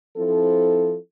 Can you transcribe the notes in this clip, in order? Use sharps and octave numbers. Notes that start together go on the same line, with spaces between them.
F3 C4 E4 A4